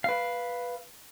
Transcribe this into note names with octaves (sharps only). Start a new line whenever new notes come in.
B4 F5